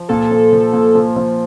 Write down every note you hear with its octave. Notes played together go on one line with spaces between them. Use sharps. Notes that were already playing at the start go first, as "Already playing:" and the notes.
Already playing: F3
A#2 A4
F3
F3
A#2
F3
F3